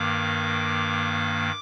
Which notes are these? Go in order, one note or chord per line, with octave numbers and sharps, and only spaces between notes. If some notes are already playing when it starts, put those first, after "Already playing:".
Already playing: G2 D#3 A#3 D6